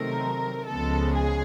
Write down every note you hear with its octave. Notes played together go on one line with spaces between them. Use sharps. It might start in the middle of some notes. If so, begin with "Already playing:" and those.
Already playing: C3 D#3 F#3 A3 C4 A#4
C#2 C#3 F3 G#3 B3 A4
G#4